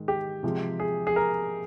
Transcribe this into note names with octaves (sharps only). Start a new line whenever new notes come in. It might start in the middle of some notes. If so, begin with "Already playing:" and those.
Already playing: G#2 D#3
G4
C3 F3 G#3
G#4
G#4
A#4